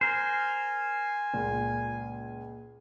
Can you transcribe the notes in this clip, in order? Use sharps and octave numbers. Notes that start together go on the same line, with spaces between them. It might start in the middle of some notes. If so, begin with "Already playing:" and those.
A#4 C5 G#5
C#2 A#2